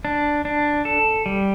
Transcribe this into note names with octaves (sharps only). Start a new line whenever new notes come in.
D4
D4
A4
G3